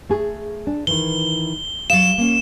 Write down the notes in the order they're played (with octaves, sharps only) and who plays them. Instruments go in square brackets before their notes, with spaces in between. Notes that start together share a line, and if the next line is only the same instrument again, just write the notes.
[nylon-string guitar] A3 G#4
D4
[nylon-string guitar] D#3 E3 [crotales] G7
[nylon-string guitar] F#3 F5 [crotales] E7
[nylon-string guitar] A#3 C#4